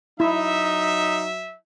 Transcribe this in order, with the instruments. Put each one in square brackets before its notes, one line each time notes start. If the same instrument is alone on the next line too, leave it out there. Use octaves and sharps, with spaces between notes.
[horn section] F#3 E5 [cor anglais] D#4 [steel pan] E4